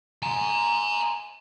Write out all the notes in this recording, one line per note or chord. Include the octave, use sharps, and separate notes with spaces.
G#5 A#5